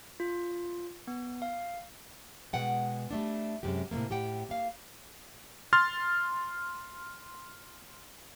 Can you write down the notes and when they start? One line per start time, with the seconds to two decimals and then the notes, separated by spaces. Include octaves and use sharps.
0.20 F4
1.07 B3
1.42 F5
2.53 B2 G#3 F#5 G5
3.11 G3 A3 D4
3.63 F#2 C3 G#3 G4
3.91 A2 C3 F3 A3 A#3
4.10 A2 G4 F#5 G5
4.49 A#3 F5
5.73 C6 F6 A6